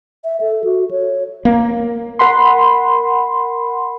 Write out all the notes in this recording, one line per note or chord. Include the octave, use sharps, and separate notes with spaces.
E5
A4
F#4
C#5
A#3
A#4 F#5 B5 C6